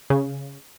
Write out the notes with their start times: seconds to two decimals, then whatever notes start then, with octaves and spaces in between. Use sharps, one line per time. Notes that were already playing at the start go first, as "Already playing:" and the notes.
0.10 C#3